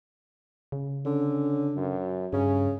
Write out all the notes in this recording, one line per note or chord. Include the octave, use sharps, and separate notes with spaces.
C#3
D3 C#4
F#2
G2 C#3 C#4